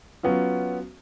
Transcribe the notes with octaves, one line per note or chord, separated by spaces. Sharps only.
F#3 B3 C#4 F4